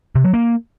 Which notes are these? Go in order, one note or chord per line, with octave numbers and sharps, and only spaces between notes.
C3
F#3
A#3